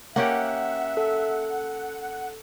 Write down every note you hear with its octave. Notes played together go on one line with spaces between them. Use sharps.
A#3 C#4 G4 E5 F#5
A4